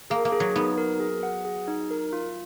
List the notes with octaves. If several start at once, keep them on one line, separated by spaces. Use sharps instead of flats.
A#3 G#4
A#3
G#4
F#3
B3 D#4
A#4
G#4
F#5
G#4
D#4
A#4
F4